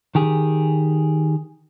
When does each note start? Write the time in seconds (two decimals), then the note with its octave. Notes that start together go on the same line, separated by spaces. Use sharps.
0.15 D#3 G4 G#4